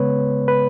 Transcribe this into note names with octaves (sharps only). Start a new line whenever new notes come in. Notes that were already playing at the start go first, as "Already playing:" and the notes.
Already playing: C#3 G#3 B3 B4 C#5
B4